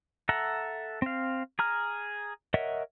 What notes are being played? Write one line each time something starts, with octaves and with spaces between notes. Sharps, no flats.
A4 E5 F#5 A#5
C4 F5
G#4 A#5 F6
A#4 C#5 D#5 E5 F#5